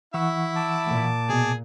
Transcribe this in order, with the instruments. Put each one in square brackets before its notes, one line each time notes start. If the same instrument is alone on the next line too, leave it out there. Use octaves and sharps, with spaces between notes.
[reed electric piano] E3 F#5 C#6 [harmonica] E4 E5
[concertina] A5 D6
[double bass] A#2
[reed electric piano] B2 B3 [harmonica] G#4